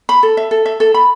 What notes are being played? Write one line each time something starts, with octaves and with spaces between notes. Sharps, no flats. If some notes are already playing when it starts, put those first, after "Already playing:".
B5
A4
E5
A4
E5
A4
B5